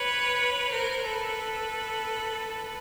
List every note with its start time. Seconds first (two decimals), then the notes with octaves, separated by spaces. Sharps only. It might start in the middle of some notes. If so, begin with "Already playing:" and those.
Already playing: B4 C#5
0.70 A#4 C5
1.03 A4 B4